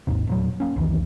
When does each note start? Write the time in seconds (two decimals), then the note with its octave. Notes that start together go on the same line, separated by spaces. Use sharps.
0.07 G#1 D#2 G#2 C3
0.27 E1 A#2 F#3
0.60 A#3 C#4
0.76 C2 F2 D#3 E3